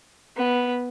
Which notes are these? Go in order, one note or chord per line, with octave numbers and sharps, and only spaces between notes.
B3